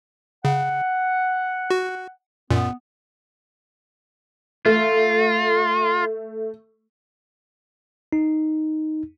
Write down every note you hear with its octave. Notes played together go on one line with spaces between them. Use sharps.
C#3 F#5
F#4
F#2 A#2 B3
A3 F4
D#4